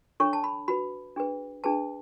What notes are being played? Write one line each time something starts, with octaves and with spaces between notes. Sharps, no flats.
D4 A4 C#5 C#6
A5
B5
F#4 B4 B5
D4 G#4 B4
D4 G#4 B4 A5